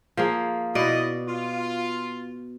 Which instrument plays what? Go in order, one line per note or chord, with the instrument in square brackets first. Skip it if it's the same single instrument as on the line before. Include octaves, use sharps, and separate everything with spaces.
[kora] F3 A#3 G#4
[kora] B2 D5 [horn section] E4 D#5
[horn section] F4